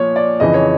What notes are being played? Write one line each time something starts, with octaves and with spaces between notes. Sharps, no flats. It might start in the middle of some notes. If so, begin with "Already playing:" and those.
Already playing: A#2 F3 C#5
D5
F2 C#3 E3 D#5
C#5